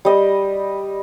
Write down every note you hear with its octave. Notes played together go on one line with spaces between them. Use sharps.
G3 D#5